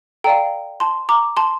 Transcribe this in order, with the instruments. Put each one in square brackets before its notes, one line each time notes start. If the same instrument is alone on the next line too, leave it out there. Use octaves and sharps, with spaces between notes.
[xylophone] A4 D5 F5 G5 A#5
A5 C6
A#5 D6
A5 C6